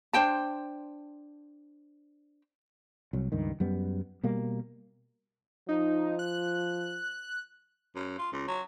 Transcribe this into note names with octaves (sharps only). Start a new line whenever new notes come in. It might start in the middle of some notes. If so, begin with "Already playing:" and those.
D4 C5 G5 A5
C2 F#3
C#2 G2 D#3
F#2 G3 B3
B2 G3 A#3
F3 D#4
F#6
F#2
F4
C#2
F#3